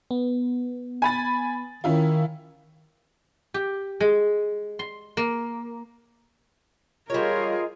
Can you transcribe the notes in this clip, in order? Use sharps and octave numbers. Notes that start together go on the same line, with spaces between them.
B3
G#5 B5 A6
D#3 C#4 E4 F4
G4
G#3
C6
A#3
G3 F4 G#4 A#4 C#5 D#5